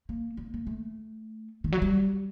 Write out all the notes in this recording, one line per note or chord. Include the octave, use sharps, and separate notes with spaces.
A#3
A#3
A#3
A3
D#3
F#3
G3